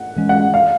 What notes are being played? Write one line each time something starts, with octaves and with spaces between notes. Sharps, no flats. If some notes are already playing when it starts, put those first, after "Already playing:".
Already playing: F#5
E3 G#3 C#4
F#5
F5